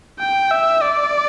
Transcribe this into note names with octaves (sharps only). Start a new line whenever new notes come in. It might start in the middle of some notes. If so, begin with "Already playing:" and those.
G5
E5
D5